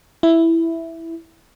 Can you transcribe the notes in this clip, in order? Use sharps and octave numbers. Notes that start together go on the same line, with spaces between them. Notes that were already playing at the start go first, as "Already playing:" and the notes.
E4